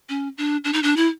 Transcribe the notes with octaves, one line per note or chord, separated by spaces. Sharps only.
C#4
D4
D4
D#4
D4
E4